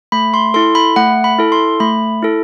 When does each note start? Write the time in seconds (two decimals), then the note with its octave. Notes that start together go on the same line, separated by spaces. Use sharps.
0.12 A3 B5
0.34 C6
0.54 E4 A4 C6
0.75 B5
0.96 A3 F#5
1.24 B5
1.38 E4 A4
1.52 C6
1.80 A3 B5
2.22 E4 A4